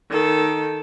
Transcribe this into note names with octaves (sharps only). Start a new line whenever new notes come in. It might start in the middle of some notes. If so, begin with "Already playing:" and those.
D#3 A4